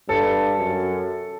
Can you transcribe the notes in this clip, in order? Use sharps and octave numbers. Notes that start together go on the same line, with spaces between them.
G2 A4
F#2